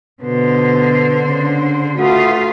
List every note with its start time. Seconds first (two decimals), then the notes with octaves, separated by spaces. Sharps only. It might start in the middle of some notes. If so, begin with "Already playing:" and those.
0.22 B2 D3 B3 C5
1.25 C#3 D4
1.97 A3 F4 F#4 B4 D#6